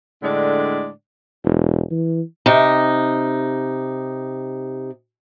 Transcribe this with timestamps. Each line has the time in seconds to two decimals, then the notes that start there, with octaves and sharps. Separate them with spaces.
0.23 A2 D3 G#3 D4 D5
1.44 E1
1.91 E3
2.46 C3 D#4